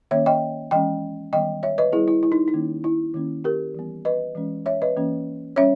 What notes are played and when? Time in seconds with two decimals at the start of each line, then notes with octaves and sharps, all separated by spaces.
0.11 D#3 A#3 C#4 C#5 E5
0.26 D#5 G5
0.71 E3 G#3 C#4 D#5 G5
1.33 D#3 G3 B3 D#5 G5
1.63 C#5 E5
1.78 B4 D#5
1.92 G3 B3 E4 G#4
2.08 E4
2.23 E4
2.32 D#4
2.48 D#4
2.53 D#3 A#3 C#4
2.84 E4
3.14 D#3 A#3 C#4
3.44 G4 A#4
3.75 E3 G3 B3
4.05 B4 D#5
4.35 E3 G#3 C#4
4.66 C#5 E5
4.82 B4 D#5
4.97 E3 A#3 C#4
5.56 G3 C#4 C#5 E5